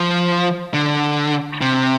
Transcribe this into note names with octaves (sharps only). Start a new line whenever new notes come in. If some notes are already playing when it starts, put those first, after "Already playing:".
Already playing: F3
D3
C3